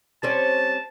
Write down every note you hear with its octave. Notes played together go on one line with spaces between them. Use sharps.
G3 C4 C#4 A5